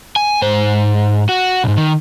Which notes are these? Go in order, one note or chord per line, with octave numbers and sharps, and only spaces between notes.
G#5
G#2 C5
F#4
B1 G#2
D#3